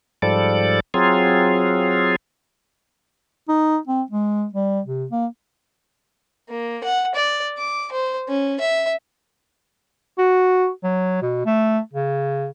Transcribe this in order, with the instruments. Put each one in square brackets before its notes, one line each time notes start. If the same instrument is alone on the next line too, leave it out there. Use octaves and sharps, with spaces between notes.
[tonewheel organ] G#2 F3 G3 A4 D5
F#3 C4 F4 G#4
[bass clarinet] D#4
C4
G#3
G3
C3
A#3
[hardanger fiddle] A#3
F#5
D5
D6
C5
C#4
E5
[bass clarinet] F#4
F#3
B2
A3
C#3